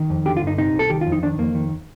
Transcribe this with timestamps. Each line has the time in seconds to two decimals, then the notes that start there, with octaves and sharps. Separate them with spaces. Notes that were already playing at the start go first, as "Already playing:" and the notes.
Already playing: D#3
0.10 F2
0.26 D3 G4
0.37 F4
0.42 G2
0.47 D#4
0.58 C3 D#4
0.74 C2
0.79 A4
0.90 D#3 G4
1.01 F4
1.07 F2
1.12 D#4
1.23 D#3 D4
1.39 F2 A#3
1.55 D#3